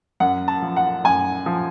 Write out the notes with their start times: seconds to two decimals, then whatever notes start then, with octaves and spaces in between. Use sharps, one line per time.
0.20 F#2 F#5
0.48 A5
0.62 F3
0.76 F#5
1.04 F#2 G#5
1.46 F3